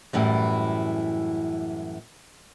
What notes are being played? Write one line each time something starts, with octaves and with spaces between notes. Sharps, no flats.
F#2 A2 E3 G3